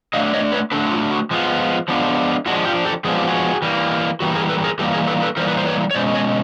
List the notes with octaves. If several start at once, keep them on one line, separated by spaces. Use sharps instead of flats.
F#3 A3 D4 D#5 F5
C#5 D#5
B4 C#5
F#3 A3 D4 A4 B4
F4
F#4
F3 G#3 B3 D4 F4
F3 G#3 B3 D4 F4
F3 G#3 B3 D4 F4 F#4
F4 G4
G4 A4
F3 G#3 B3 D4 F4 G#4
G4
F#4 G#4
E3 G3 A#3
E3 G3 A#3 F#4
G#4 A#4
A4 B4
G#4 A#4
E3 G3 A#3 G4 A4
G#4 A#4
A4 B4
A4 B4
E3 G3 A#3 A#4 C5
B4
C5
B4 C#5
C#5
B2 G#3 C#4 C5 D5
C#5 D#5